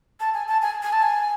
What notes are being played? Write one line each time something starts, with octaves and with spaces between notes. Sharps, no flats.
A5
G#5
A5
G#5
G#5
A5
G#5